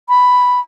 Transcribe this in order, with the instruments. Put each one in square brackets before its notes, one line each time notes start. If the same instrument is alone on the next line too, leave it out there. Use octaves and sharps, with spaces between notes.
[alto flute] B5